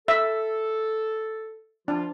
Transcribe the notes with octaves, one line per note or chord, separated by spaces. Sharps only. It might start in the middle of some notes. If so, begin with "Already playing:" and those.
A4 E5
F3 D4 F4